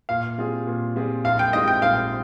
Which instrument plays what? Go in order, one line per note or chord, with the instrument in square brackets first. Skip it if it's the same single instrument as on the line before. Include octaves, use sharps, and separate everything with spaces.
[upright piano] A#2 [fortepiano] F5
[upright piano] G3 C4 F4 G#4
A#2
G3 C4 F4 G#4
[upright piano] A#1 [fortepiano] F5
[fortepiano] G5
[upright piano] G#2 G3 C4 F4 [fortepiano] D#5
[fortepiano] G5
[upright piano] A#1 [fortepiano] F5